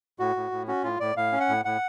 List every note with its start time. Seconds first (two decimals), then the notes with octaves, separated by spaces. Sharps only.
0.19 A2 F#4
0.36 A2
0.52 A2
0.68 C#4 F#4
0.84 A2 F4
1.00 A2 D5
1.16 A2 F5
1.32 C#4
1.40 F#5
1.49 A2
1.65 A2 F#5